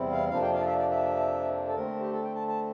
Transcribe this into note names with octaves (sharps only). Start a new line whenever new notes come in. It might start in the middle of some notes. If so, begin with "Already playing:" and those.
Already playing: E2 C3 G3 C4 E4
F5
F2 C3 F3 A#3 D4 F5
G5
F5
D5
E5
D5
E5
A4
D3 A3 C4 A#4
G4
A4
G5
A5
A5